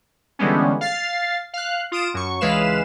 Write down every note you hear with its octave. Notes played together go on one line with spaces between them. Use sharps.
D3 E3 G3 G#3 B3 C#4
F5 A6 C7
F5 F#6
F4 D#6 D7 E7
F#2 C#6
C#2 E3 G#3 B4 F5 E7